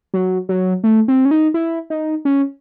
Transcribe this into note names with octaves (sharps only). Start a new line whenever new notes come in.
F#3
F#3
A3
C4
C#4
D#4
E4
D#4
C#4